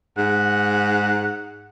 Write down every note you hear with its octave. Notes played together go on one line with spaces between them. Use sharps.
G#2 F#5